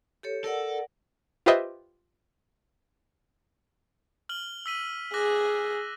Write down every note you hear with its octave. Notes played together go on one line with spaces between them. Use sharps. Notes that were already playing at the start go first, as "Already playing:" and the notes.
G4 A4 C#5
A4 A#4 D5 F#5
F4 G4 B4 C5 D#5 E5
F6 F#7 G7
E6 B6 D#7
G#4 D6 F#6 A#6